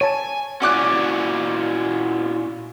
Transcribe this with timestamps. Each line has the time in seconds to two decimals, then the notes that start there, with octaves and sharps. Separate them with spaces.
0.01 C#5 G#5 A5
0.62 A#2 C#4 E4 F#4 D5 D6 F#6